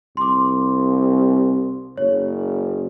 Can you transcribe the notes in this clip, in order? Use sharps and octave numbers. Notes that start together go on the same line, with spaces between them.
C2 C6 D6
F#1 C#5